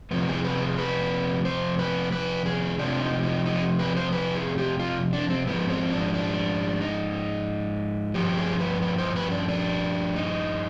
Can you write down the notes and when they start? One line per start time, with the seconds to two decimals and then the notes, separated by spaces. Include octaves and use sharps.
0.11 F2 C3 F3 B3
0.28 G#4
0.44 B4
0.61 G#4
0.78 B4
1.45 C5
1.79 B4
2.12 B4
2.46 G#4
2.79 F2 C3 F3 D4
3.01 D#4
3.23 D#4
3.46 D#4
3.79 B4
3.96 C5
4.12 B4
4.35 G#4
4.58 G4
4.79 F4
5.13 D4
5.30 C4
5.47 G#2 F3 B3
5.70 C4
5.92 D4
6.14 D4
6.81 D#4
8.14 G2 F3 G4
8.37 G#4
8.60 B4
8.82 B4
8.98 C5
9.16 B4
9.32 D4
9.48 D4
10.16 D#4